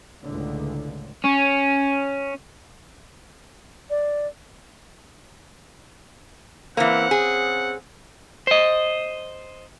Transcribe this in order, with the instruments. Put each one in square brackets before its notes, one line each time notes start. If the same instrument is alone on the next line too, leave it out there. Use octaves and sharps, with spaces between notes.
[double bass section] C#2 A2 D3
[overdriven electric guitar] C#4
[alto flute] D5
[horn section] C#3 C4 F#5 [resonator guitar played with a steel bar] E3 A#3
[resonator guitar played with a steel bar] G#4
[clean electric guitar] C5 D#5